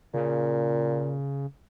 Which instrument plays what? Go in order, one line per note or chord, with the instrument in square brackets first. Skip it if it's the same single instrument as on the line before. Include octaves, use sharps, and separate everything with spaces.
[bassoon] A#2 [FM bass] C#3